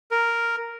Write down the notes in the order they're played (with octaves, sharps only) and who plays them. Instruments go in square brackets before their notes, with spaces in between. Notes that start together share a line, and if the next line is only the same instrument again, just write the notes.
[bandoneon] A#4